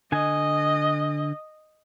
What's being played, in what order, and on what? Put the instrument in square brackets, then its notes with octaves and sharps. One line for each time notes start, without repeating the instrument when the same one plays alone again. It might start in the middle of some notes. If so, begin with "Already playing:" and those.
[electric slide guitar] D3 G#5 [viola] D#5